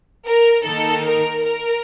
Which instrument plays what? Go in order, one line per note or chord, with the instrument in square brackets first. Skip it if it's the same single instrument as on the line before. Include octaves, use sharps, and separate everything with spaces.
[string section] A#4
D#3 A#3 D#4 A4
A#4
A#4